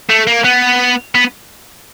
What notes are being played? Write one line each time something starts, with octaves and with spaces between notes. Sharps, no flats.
A3
A#3
B3
B3